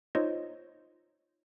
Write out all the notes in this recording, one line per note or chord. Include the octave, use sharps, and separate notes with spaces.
D#4 F4 C5 C#5 D#5